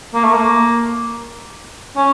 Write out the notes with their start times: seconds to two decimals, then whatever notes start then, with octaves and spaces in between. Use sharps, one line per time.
0.14 A#3
0.24 A3
0.33 A#3
1.96 C#4